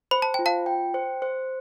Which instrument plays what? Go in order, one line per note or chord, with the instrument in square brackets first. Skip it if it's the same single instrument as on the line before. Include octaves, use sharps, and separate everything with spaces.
[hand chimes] C5 [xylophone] B5
[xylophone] A5
[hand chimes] F4 [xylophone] G5
[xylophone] F5 A5
[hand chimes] G5
C5
C5